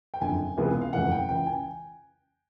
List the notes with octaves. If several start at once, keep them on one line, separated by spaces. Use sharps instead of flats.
G5
F#1 F2 D3 G#5
C#2 C3 E3 G#3 B3
F5
F#1 F2 C#3 E3 A3 F#5
G5
C#2 C#3 E3 G5
G#5